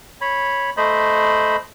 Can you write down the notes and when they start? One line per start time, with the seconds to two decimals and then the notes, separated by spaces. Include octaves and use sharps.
0.21 C#5 B5
0.77 A3 C5 D#5 B5